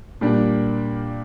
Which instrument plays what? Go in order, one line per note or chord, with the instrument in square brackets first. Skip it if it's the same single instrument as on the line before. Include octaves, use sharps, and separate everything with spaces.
[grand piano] A#2 G3 A#3 D4